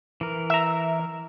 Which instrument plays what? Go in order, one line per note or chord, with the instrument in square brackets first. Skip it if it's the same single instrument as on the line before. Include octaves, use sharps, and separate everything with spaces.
[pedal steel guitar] E3 A#4
[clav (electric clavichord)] E5 A#5